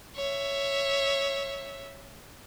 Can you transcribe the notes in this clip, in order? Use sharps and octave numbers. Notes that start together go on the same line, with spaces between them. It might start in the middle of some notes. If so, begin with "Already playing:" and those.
C#5 E5